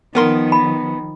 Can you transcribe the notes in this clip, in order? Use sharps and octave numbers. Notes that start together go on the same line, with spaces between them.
D#3 F3 B3 A#4 C6
B5